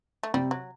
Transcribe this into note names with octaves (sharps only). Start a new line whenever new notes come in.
A3
C3 G3
F#3